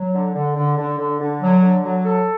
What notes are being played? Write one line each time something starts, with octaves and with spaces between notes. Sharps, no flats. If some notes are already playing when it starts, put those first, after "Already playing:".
Already playing: F#3
D3
D3
D3
D3
D3
D3
F#3
D3
F#3
A4